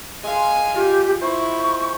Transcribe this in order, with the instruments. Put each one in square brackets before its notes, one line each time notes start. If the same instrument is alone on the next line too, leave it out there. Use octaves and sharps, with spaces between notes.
[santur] G#3 [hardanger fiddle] F5 G#5
[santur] F4 [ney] G4
[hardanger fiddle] E4 [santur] C5 [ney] C#6